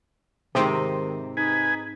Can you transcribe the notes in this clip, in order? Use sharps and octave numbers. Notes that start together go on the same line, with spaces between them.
G#2 C3 D#3 C4 D#5
D#4 G#4 B4 G#5